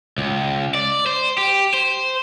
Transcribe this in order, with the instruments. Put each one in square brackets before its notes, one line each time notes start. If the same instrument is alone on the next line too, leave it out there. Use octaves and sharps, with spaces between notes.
[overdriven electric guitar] C#2
D5
C5
G4
C5